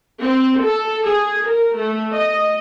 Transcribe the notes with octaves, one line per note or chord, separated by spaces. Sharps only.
C4
A4
G#4
A#4
A3
D#5